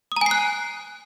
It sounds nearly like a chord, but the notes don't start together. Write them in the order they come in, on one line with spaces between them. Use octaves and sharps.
D#6 A#5 G#5 C7 F#6